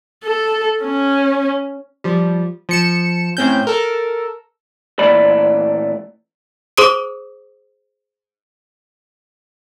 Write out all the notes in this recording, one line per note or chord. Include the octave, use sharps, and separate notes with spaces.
A4
C#4
F3 G3
F3 C#7 E7
A2 C4 C#4 G6
A4 A#4
A#2 E3 A3 D5 B5
G#4 C5 C6 D6 D#6 D7